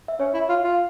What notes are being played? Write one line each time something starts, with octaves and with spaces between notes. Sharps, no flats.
E5
C#4 C#5
E4
F4
F4